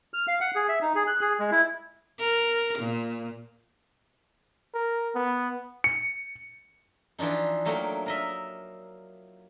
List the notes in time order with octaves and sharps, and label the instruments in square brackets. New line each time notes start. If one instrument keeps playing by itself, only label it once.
[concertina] F6
F5
F#5
G#4
E5
D#4
G#4
F#6
G#4
G#3
E4
[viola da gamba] A#4
A#2
[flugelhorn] A#4
B3
[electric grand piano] C#7
[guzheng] E3 F3 D4 D#4
F#3 A3 A#3 G5
A#4 D#5 E5